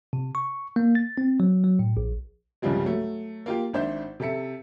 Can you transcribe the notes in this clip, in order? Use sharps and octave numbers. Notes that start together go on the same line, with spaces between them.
C3
C#6
A#3
A6
C4
F#3
F#3
A2
A#1
C2 G2 C#3 F3 G3 G#3
F#3 A3
A#3 F4 G4
G#1 D4 C5 E5 G6
C3 A4 E5 C#7